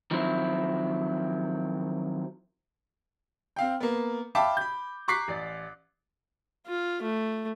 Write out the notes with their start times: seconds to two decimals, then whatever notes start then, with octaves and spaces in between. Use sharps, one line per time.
0.11 D#3 F3 F#3 C4 E4
3.56 C4 F5 G5
3.80 A#3 B3
4.35 E5 F5 G5 A5 B5 D6
4.57 B5 G6
5.08 A#5 C#6 D6 F#6 B6 C7
5.28 A1 D5
6.67 F4
7.02 A3